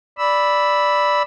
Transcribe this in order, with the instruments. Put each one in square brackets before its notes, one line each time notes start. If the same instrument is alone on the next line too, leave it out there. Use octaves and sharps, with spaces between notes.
[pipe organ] D5 B5 E6